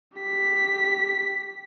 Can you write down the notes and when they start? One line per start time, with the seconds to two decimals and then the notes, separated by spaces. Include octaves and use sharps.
0.18 G4 B6